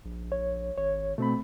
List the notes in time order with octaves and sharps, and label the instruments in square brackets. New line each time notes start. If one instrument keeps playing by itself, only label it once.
[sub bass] A#1
[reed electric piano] C#5
[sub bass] G#1 [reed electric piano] C#5
[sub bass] B2 [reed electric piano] A3 C4 B5